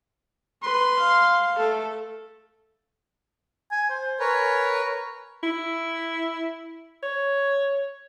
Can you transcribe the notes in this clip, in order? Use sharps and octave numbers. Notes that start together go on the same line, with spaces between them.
B4 C6
F5
A3 A4
G#5
C5
A#4 B4 C#5 G#5
E4
C#5